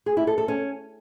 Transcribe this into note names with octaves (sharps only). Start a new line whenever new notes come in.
G#4
E4
A4
A4
C#4